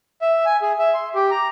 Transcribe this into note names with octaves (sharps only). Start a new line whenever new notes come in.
E5
G#5
G#4
E5
C6
G4
A#5